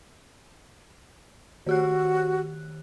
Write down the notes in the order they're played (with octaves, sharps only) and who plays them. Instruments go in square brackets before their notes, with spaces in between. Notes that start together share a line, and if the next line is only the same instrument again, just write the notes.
[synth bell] D#3 G4 F#6 [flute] F#4